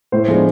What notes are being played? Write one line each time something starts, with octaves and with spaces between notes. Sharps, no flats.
A2 C5
F3 G#3 B3 D4